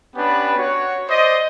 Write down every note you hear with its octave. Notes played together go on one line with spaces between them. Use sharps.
B3 C#4 D4 G4 B4
F#4 C#5
C5 D5 D#5